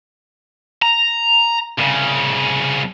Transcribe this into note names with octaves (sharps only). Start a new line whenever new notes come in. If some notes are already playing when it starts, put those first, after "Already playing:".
A#5
C2 C#3